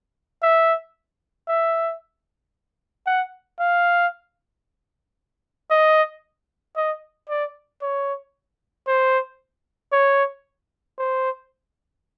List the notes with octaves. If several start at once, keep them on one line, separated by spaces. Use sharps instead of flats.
E5
E5
F#5
F5
D#5
D#5
D5
C#5
C5
C#5
C5